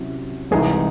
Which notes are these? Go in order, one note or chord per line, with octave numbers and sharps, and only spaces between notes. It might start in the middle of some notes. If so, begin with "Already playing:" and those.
Already playing: C3 F#3 C#4 E4
C2 C3 E3 G#3 D#4 G#4